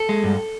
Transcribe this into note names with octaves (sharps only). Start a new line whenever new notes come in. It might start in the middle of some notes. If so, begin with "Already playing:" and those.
Already playing: A4
G#3
G2